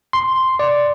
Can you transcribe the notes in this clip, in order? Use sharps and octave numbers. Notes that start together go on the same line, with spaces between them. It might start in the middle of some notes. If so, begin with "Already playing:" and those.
C6
D5